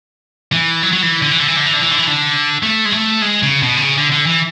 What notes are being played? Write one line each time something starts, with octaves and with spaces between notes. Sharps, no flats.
E3
F#3
F#3
E3
D3
E3
D3
E3
D3
E3
D3
E3
D3
E3
D3
A3
G#3
A3
G#3
C#3
B2
D3
C#3
D3
D3
E3